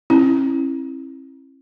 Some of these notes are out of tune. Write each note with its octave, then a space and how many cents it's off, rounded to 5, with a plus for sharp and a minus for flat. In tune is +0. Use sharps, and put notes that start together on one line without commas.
C#4 -45 E4 +0